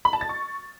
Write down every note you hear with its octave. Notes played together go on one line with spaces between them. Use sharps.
B5
A5
A6
C#6